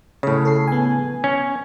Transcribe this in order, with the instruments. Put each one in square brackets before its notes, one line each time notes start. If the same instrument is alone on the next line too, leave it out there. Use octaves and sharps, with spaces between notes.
[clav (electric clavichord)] A2 C#3 [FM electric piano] C#5
[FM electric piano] A4 C7
B3 G#5
[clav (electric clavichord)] C#4